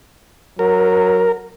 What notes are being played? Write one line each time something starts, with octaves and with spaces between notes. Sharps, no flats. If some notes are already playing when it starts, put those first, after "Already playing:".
F#3 A#4